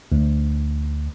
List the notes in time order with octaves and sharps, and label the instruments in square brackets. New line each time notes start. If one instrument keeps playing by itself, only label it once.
[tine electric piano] D2